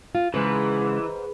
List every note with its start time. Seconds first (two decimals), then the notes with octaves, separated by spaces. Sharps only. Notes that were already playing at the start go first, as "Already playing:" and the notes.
0.15 F4
0.34 G#2 C#3 E3 G#3 B4